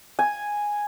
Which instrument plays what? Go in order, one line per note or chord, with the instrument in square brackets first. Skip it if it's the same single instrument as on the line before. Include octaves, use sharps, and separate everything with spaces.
[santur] G#5